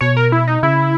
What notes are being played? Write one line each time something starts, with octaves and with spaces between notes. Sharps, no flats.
B2 C#5
A#4
E4
D#4
C#3 E4